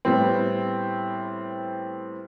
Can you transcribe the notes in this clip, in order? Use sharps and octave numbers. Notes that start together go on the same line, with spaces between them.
A2 G3 B3 C4